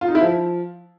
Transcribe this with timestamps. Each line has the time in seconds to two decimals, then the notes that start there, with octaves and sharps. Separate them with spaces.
0.01 F4
0.08 D#4
0.15 E4
0.22 F3